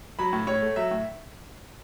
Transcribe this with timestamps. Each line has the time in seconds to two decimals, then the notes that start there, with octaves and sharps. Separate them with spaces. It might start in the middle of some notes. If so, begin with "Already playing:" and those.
0.19 F#3 B5
0.33 A2
0.47 A2 C#5
0.62 A3
0.76 F#3 E5
0.91 A2